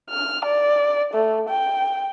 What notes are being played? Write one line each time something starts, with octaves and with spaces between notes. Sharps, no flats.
F6
D5
A3
G5